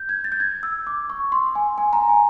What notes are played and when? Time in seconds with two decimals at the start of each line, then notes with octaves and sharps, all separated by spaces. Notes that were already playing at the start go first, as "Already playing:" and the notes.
Already playing: G6
0.09 G#6
0.24 A6
0.32 G6
0.40 G#6
0.63 E6
0.87 D6
1.10 C#6
1.32 C6
1.55 G#5
1.78 G#5
1.93 A#5
2.09 G#5